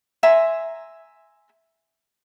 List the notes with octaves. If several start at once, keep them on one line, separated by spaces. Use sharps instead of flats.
E5 G#5 A#5 C6